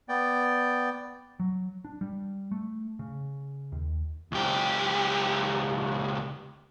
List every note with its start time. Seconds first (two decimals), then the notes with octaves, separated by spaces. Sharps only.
0.09 B3 D5 G5
1.40 F#3
1.85 D4
2.01 G3
2.51 A3
2.99 C#3
3.72 D#2
4.32 C#2 G4